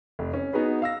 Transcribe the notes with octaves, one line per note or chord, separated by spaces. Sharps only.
F1
C#4
B3 D#4 F#4 G#4 B4
F5 E6 A#6